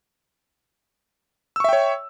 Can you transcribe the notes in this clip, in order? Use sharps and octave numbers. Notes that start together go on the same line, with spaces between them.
C#5 E5 G5 C#6 E6